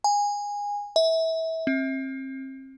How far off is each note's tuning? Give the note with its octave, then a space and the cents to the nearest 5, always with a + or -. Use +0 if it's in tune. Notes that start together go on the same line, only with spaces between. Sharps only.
G#5 -20
E5 -25
C4 +35